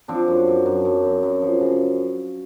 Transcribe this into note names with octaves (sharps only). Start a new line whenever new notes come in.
F3 C4 D4
F#2
F#2
F#2
F#2
F#2
F#2
F3
C#3